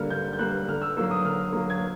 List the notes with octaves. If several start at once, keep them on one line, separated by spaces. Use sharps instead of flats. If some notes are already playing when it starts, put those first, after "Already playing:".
Already playing: D3 G3 A#3 F6
D3 G6
G6
G3 A#3 F#6
D3 F6
E6
F#3 A#3 E6
D#6
D3 F6
F#3 A#3
G#6